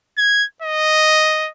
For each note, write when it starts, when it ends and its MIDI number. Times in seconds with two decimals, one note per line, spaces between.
0.18 0.45 92
0.62 1.50 75